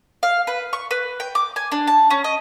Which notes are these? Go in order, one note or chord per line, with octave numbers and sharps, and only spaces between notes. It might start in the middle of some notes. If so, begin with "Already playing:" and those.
F5
B4
C#6
B4
G5
D6
G#5
D4
A5
C#4
D#5